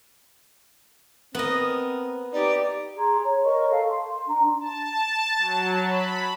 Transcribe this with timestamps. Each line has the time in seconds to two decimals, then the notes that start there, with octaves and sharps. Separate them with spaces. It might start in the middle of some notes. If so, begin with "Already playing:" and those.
1.35 B3 C4 A#4 D#5
2.33 D#4 G4 B4 D5
2.97 G#4 A#5 C6 G#6
3.24 C#5
3.45 A#4 C#5 D#5 C#6
3.70 A4 F5
3.86 C6
4.28 D4 A#5
4.60 A5
5.38 F#3
5.84 B5